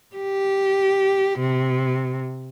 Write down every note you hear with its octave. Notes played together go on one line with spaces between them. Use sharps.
G4
C3